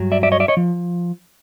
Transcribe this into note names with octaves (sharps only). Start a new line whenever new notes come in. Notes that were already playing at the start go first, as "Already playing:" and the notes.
Already playing: G2 F#3
D5 E5
D5 E5
C#5 D#5
D5 E5
C#5 D#5
F3